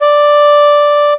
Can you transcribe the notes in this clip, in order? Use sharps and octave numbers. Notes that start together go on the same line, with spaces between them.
D5